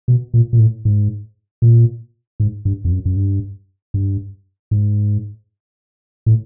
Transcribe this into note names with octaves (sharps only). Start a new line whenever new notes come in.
B2
A#2
A#2
A2
G#2
A#2
G#2
G2
F2
F#2
F#2
G2
G2
G#2
A2